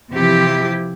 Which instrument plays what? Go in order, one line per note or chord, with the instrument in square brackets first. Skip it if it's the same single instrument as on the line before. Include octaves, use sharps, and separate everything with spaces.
[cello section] C3 E3 F3 E4 G4